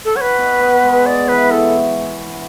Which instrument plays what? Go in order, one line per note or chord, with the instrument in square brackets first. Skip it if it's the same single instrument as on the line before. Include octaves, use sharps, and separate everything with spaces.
[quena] A4
[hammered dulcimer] F#4 [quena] C#5
[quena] B4
[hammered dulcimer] B2
B3
G#3
[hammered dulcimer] G#4 [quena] D5
[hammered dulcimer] E3 [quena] B4
[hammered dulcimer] E4 [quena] A4